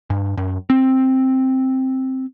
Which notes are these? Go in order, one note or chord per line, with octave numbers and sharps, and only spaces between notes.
G2
F#2
C4